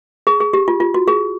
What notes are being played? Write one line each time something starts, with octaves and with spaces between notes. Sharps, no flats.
G#4
G#4
G4
F4
F4
F#4
G#4